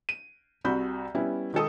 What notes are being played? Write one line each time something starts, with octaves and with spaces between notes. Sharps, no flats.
D#7
C2 C3 F#4 B5 G6
G3 B3 C#4 E4
D#3 G#3 A4 D#6